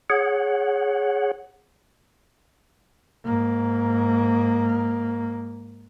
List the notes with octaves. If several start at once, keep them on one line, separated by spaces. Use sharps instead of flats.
G#4 C#5 F#5
G#2 A#3